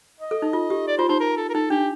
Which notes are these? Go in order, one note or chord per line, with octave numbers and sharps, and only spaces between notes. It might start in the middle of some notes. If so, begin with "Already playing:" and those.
D#5
A4
D#4
F4
G4
D5
F4 C5
D#4 C5
A#4
A4
A#4
D#4 A4
D4 G4